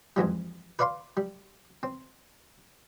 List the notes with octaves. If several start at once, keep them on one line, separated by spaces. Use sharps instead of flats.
F2 G#2 E3 G3
B4 D5 F5 B5 C6
G3
C4